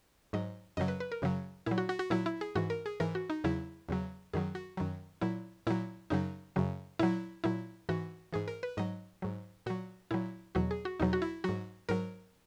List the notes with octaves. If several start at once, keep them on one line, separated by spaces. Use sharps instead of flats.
G#2 F#3 D#5
F#2 C#3 F#3 D#5
B4
B4
A#4
F#2 C#3 F#3
A#2 F#3 E4
F#4
F#4
F#4
A#2 F#3 E4
E4
G#4
G#2 E3 F#4
A#4
G#4
G#2 E3 A#4
F#4
D#4
E2 C#3 F#3 E4
E2 C#3 F#3
F#2 D#3 F#3 G#4
F#4
F#2 D#3 F#3
A#2 F#3 E4
A#2 F#3 E4
F#2 C#3 F#3 D#4
F#2 C#3 F#3
A#2 F#3 E4
A#2 F#3 E4
G#2 E3 F#4
G#2 E3 G#4
A#4
B4
G#2 F#3 D#5
G#2 F#3
A#2 F#3 F#4
A#2 F#3 E4
E2 B2 F#3 F#4
G#4
F#4
E2 B2 F#3 D#4
F#4
E4
G#2 F#3 F#4
G#2 F#3 A#4